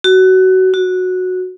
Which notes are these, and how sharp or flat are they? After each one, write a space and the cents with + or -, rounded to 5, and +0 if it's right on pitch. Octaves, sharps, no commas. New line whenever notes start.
F#4 +20
F#4 -10